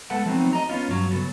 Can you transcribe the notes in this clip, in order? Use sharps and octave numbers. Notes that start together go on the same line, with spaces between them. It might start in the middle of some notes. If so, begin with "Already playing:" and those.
G#3 A3 B3 A4 B4 F#5
F3 F#3 A3 B3 C4 D#4
D#5 A#5
B3 C#4 F4
G2 F#3
C#3 F#3 B3 A4